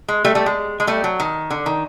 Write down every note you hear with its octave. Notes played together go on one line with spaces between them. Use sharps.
G#3
G3 A3
G3 A3
G#3
G#3
G3 A3
F#3
D#3
D3
D#3